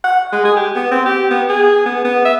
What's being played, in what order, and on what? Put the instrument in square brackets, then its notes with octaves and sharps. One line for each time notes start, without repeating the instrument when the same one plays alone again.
[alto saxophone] F#5
G#3
G#4
G4
B3
C4
G4
B3
G#4
B3
B3
E5